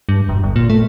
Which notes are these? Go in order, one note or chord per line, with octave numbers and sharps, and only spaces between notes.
G2
E1
G1
A#2
A3